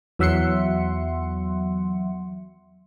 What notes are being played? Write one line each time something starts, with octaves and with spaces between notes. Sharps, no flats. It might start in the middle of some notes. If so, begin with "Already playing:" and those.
E2 F#3 E5 F#5 C6 C#7